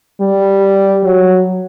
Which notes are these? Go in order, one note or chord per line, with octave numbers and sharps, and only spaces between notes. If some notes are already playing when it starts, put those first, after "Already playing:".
G3
F#3